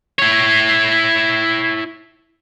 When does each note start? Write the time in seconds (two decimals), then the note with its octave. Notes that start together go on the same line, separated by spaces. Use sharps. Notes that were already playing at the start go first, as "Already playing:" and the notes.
0.19 E4 C#5